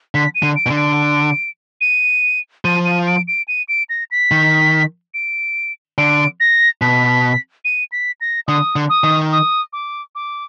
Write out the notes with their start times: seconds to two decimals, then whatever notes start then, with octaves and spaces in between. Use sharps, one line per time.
0.15 D3 B6
0.35 D#7
0.43 D3
0.56 D7
0.66 B2
0.70 D3
0.77 D7
1.81 D#7
2.65 F3 D#7
2.85 D#7
3.07 D7
3.28 D7
3.48 D#7
3.69 D7
3.89 A#6
4.11 B6
4.31 D#3
5.14 D7
5.98 D3 D7
6.40 A#6
6.81 B2 B6
7.65 D#7
7.92 B6
8.21 A#6
8.48 D3 D#6
8.76 D3
8.90 D#6
9.04 D#3
9.32 D#6
9.73 D6
10.15 D6